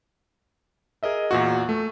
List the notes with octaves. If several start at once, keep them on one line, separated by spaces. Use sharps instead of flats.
G#4 A#4 D#5 E5
E2 A#2 F#4
A3